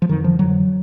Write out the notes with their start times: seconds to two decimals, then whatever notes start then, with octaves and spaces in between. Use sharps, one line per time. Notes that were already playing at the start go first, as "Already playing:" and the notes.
0.02 F3
0.09 F2 D3 D#3
0.24 F3
0.39 F2 D3 F#3